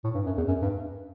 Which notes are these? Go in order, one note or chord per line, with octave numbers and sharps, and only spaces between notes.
A2
G2
F#2
E2
F#2
G2